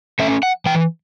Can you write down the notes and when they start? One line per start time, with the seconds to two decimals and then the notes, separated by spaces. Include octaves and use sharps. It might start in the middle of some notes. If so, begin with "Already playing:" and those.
0.19 A3 C#4 E5
0.43 F#5
0.66 E3 G5